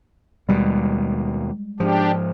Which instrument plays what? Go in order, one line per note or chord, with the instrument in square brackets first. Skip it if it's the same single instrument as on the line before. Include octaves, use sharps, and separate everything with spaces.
[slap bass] D#2 B2 [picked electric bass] G3 G#3
[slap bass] G#2 F3 [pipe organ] D4 G4